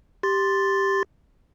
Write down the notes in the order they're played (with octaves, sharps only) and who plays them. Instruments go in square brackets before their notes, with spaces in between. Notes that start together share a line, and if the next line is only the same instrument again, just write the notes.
[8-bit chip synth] G4 C6 A6